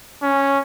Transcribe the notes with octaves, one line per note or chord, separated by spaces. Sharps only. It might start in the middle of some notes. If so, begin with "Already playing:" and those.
C#4